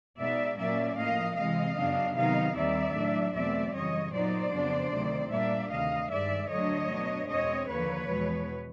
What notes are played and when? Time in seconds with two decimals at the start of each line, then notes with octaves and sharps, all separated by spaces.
0.18 B2 G#3 B3 D#4 D5 E5
0.58 A#2 F#3 A#3 C#4 D5 E5
0.97 A2 F3 A#3 D#5 F5
1.36 C3 E3 G#3 C4 D#5 F5
1.76 F#2 C#3 F#3 B3 D4
2.16 C3 D#3 F#3 B3 D#4 D#5 F5
2.55 D#2 D#3 G3 C4 D#4 D5 E5
2.95 A2 F#3 A3 D4
3.34 E2 B2 F#3 A3 C4 D5 E5
3.73 F#2 C#3 E3 G3 C#5 D#5
4.13 A#2 F#3 B3 D#4 C5 D5
4.53 F2 C#3 F#3 B3 D4
4.92 D2 C3 D#3 F#3
5.31 A#2 G3 A#3 D4 D5 E5
5.71 D2 C3 D#3 D#5 F5
6.10 G2 D#3 G#3 D5 E5
6.50 D2 D3 F#3 A3 D4 C#5 D#5
6.90 B2 F#3 B3 D4
7.29 E2 B2 G#3 C4 C#5 D#5
7.68 D#2 D3 F3 A#3 B4 C#5
8.08 E2 B2 G#3